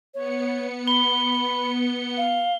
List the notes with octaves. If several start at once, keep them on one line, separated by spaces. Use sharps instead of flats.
B3 C#5 C#7
B5 G7
F5